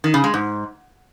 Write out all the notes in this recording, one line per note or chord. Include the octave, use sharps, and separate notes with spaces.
D#3
C#3
G#3
G#2